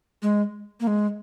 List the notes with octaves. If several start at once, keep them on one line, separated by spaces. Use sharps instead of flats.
G#3
A#3
G#3